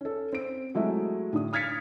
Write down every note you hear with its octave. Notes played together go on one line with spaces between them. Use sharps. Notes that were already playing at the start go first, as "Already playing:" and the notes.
C#4 A4
C4 D7
F#3 G#3 A3 E4
A2 D3 D#6
D#6 F6 G#6 A6 B6 C#7